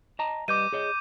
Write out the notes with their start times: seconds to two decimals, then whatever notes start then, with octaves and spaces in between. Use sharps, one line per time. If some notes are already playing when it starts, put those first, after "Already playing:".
0.19 D#5 A5 A#5
0.48 G3 B4 D#5 D6 G6 D#7
0.73 G#4 C#5 D#5